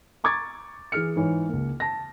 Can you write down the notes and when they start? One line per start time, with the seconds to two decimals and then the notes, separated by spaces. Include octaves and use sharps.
0.24 A#5 C#6 D6 G#6 A6
0.92 E3 G#4 F6 C#7
1.16 G#2 E3 C#5
1.49 C#2 A#3
1.80 A5 A#6